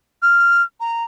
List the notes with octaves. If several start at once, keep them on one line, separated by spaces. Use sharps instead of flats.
F6
A#5